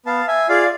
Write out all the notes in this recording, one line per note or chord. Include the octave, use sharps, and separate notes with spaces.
B3 F5 A5
E5 G#5
F4 G#4 D5 F5